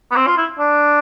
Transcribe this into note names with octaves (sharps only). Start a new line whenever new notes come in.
B3
C4
F4
E4
D4